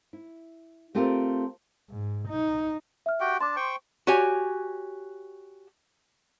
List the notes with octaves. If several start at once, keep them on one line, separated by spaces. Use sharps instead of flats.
E4
A3 C4 F4 G4 A4 A#4
G#2
D#4
E5 F6
F#4 G4 G5
D4 A5 C6 D6
C5 G5 C#6
F#4 G4 C#5 G#5